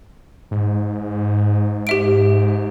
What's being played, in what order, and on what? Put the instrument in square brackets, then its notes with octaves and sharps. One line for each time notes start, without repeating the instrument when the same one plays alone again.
[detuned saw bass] G#2
[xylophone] G4 E5 D7